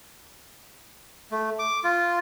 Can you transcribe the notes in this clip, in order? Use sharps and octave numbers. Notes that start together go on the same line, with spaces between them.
A3
D6
F4